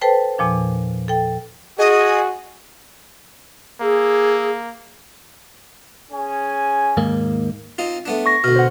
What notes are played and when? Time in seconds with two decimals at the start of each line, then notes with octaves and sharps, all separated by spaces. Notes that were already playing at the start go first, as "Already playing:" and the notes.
0.01 A4 B4 C5 G5 A5
0.38 E2 A#2 F3 D4
1.08 A4 G5
1.79 F#4 G#4 D#5
3.81 A#3 G#4 E6
6.11 C#4 G#4 G#5
6.97 D#2 G#2 A#3
7.78 C4 D#4 F4
8.06 A3 B3 D4
8.26 C#6 A#6
8.44 D2 B2 F6
8.56 C5 F#5